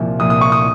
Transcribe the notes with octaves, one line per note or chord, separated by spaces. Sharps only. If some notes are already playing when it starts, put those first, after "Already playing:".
Already playing: C2 A#2 F3
C2 A#2 F3 D#6
D#6
C#6
D#6